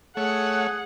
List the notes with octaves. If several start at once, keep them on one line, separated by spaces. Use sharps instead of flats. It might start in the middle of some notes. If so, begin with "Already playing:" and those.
A3 G#4 C#5 F#5